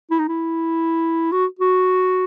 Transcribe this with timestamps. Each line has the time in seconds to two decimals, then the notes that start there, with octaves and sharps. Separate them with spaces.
0.11 E4
0.19 D#4
0.28 E4
1.32 F#4
1.59 F#4